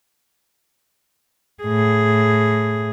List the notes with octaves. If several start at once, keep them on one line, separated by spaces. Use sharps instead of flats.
A2 G#4